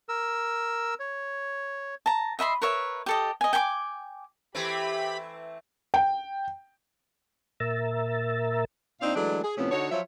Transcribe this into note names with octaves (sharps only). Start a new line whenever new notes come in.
A#4 E6
C#5
A5 A#5
D#5 E5 B5 C6
A#4 B4 C#5 E5
G4 A4 D#5
D#5 G#5
G5 G#5 B5 D6
E3 A3 C4 G4 B5
G5
A#2 A#4 E5 A#5 E6 A6
A#2 C4 D4 D#4 D5 F5
E3 F#3 G#3 A3 D4
G#4
A2 C3 F3 B3 C#4
D3 D#4 F#4 C#5
F3 F#3 F4 C#5 E5